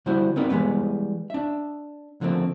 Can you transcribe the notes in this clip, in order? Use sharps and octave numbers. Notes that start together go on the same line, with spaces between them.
D3 G3 E4 F#4 C5
B3 C4 D#4 A#4 D5
E3 G3 G#3 B3 B4
D4 E5
D3 F3 A3 A#3 C4